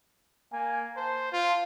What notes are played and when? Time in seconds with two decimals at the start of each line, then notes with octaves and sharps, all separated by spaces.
0.53 A#3 G#5
0.97 C5 A5
1.33 F4